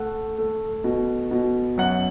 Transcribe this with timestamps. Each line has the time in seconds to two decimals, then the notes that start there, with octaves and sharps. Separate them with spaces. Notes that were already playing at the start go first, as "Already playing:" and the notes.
Already playing: A3 F#5
0.38 A3
0.84 B2
1.31 B2
1.78 F#2 F#5